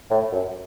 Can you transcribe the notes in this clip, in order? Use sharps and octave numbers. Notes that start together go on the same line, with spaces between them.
A2
F#2